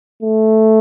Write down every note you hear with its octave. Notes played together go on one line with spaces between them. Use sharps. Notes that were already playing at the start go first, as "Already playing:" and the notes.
A3